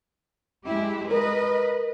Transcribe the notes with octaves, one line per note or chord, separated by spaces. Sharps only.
G#3 E4 G4
A#4 B4 D#5